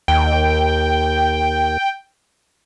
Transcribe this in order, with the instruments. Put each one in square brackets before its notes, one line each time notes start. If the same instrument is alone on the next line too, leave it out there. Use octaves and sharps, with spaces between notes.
[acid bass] D#2 [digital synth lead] G5